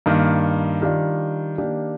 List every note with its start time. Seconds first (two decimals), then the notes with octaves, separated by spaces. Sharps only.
0.06 G2 D#3 A#3
0.81 D#3 G3 D4 F4
1.58 D#3 A#3 D4 G4